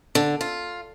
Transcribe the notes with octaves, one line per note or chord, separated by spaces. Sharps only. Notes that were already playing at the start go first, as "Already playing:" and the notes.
D3
F4